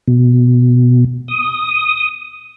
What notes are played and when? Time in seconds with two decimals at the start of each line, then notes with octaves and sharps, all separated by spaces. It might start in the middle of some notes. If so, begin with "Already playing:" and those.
0.08 B2
1.28 D#6